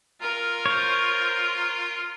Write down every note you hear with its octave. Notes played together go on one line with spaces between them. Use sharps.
F4 A#4
C5 C#5